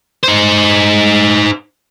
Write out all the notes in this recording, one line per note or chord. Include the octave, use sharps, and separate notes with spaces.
D#4 C5